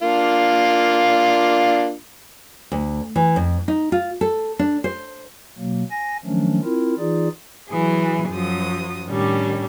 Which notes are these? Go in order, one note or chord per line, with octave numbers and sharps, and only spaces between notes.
A#3 D4 F4
D2
E3
F2
D#4
F4
A4
D4
C5
B2 F#3 A#3
G#5 A#6
D#3 F3 F#3 A3 C#4 D4
C4 E4 F4 A#4
E3 D#4 F4 G#4 D5
E3 F#3 G#4
F#2 F3 F#3 D#6
A2 D#3 G3 C#4 D4